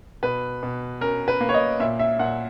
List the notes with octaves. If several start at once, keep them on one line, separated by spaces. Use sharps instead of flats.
B2 B4
B2
C#4 A#4
B4
A#3
C#5
D#5
A#2 E5
E5
A#2 F#5